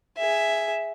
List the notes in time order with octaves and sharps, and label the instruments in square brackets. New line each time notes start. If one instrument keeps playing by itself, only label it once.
[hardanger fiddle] G#4 E5